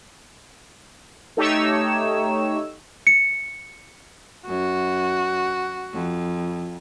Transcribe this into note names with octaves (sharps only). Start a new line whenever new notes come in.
A3 D#4 G4 C#5 E6
C#7
F#2 F#4
F2